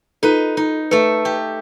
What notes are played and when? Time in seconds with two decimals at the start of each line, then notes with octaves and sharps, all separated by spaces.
0.23 D#4 F4 A4 B4
0.57 D#4
0.91 A3 A4 B4
1.25 G4